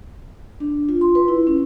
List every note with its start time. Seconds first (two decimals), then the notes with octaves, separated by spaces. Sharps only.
0.60 D4
0.89 F4
1.01 C6
1.15 B4
1.28 E4
1.47 C#4